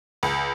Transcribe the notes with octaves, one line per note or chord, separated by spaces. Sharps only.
C#2